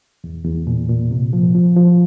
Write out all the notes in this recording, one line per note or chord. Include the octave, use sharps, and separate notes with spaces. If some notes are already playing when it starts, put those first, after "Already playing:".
E2
E2
A#2
A#2
C3
F3
F3
F3